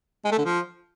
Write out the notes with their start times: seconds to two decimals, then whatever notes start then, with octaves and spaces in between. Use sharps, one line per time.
0.25 G#3
0.32 A3
0.38 D3
0.45 F3